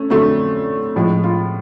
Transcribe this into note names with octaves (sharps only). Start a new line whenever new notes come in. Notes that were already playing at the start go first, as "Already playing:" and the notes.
Already playing: A3 C#4
F2 D3 F#3 A3 C4
A2 F3 G#3
F4